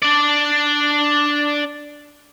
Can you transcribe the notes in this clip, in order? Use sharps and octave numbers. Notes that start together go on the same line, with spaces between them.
D4 D5